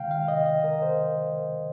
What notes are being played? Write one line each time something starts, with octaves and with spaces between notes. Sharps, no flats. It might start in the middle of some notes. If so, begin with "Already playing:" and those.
Already playing: C3 D#3 G#3 F5 G5
F5
D#5
D#5
A#4
C5